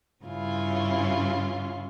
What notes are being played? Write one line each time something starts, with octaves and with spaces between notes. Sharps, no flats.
G2 C#3 C#4 E4 F4